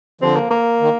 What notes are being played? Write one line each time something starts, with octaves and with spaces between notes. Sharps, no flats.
D3 F3 C4
A#3
A#3
D#3